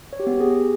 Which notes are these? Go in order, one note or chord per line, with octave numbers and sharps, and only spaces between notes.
C#5
G4
B3
G4
G#4